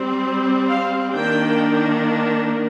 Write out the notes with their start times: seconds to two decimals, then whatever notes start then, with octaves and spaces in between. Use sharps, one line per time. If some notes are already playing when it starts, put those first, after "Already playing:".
Already playing: G3 C4
0.69 F5
1.15 D#3 A#3 D4 G5